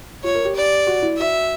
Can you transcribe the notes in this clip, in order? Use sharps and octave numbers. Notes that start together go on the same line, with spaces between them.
F4 C#5
A#4
G4
D5
F#4
E4
F#4 E5